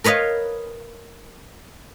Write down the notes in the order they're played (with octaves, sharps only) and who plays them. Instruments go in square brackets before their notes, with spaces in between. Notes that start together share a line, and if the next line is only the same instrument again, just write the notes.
[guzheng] A#4 B4 C#5 D#5 F5